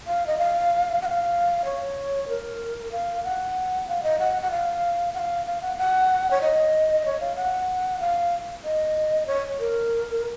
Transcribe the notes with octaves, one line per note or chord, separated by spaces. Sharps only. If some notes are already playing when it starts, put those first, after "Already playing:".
F5
D#5
F5
F#5
F5
C#5
A#4
F5
F#5
F5
D#5
F#5
F#5
F5
F#5
F5
F5
F#5
F#5
C#5
D#5
C#5
F5
F#5
F5
D#5
C#5
A#4